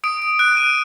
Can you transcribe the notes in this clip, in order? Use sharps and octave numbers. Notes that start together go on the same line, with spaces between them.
D#6 D7
D7
F#6 D7
D#7